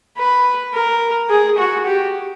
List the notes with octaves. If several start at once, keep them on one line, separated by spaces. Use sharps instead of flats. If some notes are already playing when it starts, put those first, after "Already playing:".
B4
A#4
G#4
F#4
G4